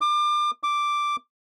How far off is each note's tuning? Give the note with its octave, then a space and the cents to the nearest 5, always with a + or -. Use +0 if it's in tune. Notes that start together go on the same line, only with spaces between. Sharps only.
D6 +30
D6 +0